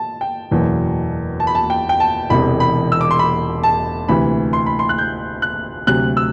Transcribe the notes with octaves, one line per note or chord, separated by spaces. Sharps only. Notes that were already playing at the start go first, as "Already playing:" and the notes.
Already playing: A5
G5
F#1 E2 B2 F#3
A5
B5
A5
G5
G5
A5
E1 E2 C3 B5
B5
E6
D6
C6
B5
A5
D2 C3 E3 B5
C6
B5
C6
F#6
G6
F#6
D2 C3 F#3 F#6
E6